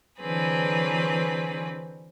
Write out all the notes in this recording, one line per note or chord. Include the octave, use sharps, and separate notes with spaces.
D3 E3 F#3 C4 G#4 B4